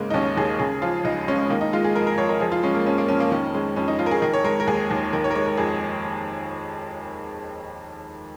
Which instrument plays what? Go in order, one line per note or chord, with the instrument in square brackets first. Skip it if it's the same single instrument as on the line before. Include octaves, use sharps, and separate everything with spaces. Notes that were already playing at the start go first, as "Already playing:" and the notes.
Already playing: [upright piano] G#2 C#3 G#3 A#3
D#4
D#2 C#4
D#2 G#4
C#3 G#4
F3 F4
C#2 D#4
G#3 C#4
D#3 A#3
D#4
G#3 F4
G#4
F2 A#4
A#4
F2 C#5
A#4
F3 G#4
F4
G#3 C#4
A#3
F2 C#4
A#3
F2 C#4
A#3
D#3 C#4
G#3 C#4
F2 C#4
D#4
F2 F4
A#4
G#4
D#3 A#4
C#5
G#3 A#4
A#4
D#2 G#4
D#2
D#3 A#4
C#5
A#4
G#3 C#5
A#4
F2 G#4